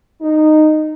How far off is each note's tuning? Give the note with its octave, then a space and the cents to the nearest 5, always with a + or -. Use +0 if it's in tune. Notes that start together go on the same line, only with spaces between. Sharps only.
D#4 -10